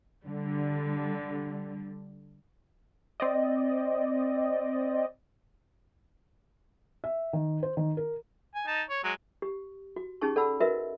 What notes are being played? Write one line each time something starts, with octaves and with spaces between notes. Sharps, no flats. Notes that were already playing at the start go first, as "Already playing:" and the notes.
D3 G3
C4 D5 D#5
E5
D#3
C5
D#3
A#4
G#5
D#4 A5
C#5
F#3 G#3
G4
F#4
C#4 D#4 G4 G#4 A5 C#6
A4 D5 F#5 A5 B5 E6
F#4 A#4 B4 D#5 E5